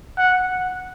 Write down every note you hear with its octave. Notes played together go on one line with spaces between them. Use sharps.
F#5